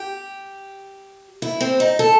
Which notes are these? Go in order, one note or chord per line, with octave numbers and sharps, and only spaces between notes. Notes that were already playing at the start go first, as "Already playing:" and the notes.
Already playing: G4
E4
C4
D#4
A4